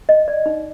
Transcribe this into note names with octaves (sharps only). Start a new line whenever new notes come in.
D#5
D5
D#4